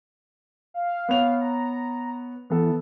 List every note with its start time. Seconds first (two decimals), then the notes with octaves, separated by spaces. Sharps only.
0.74 F5
1.08 B3 C#5 F5 F7
1.41 A#5
2.50 E3 B3 A4